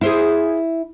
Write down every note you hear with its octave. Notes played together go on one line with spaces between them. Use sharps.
E4 G#4 C5 F5